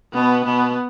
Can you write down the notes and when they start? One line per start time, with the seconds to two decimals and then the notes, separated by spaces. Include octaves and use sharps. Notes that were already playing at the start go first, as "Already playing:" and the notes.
0.13 B2 B3
0.45 B2 B3